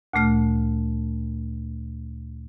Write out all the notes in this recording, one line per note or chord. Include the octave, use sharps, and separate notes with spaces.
D2 A#2 A3 F6